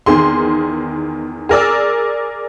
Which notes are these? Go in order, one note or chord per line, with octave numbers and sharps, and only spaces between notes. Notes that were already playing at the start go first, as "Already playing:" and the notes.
E2 D#3 G#4 C6
G#4 A#4 D5 E6